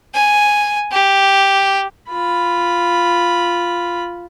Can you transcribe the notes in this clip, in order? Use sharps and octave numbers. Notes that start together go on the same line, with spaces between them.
G#5
G4
F4 B5